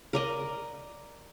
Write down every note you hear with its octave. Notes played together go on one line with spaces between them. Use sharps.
A#4 D5 D#5